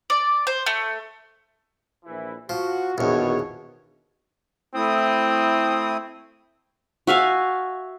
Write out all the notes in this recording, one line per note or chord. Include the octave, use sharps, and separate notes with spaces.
D5
C5
A3
A#1 E3 E4
F3 F#4
A#1 E2 B2 D#3 C#5
A3 C4 E4 D#6
F#4 E5 F5 G#5